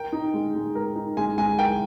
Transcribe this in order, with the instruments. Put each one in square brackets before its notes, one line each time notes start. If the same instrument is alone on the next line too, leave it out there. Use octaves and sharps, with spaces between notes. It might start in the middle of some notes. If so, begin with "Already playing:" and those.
Already playing: [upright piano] A#4 [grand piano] G5
[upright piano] D#4
G#3
G#3
A#4
D#4
[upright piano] G#3 [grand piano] G#5
[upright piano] G#3 [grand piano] G#5
[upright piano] A#4 [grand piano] G5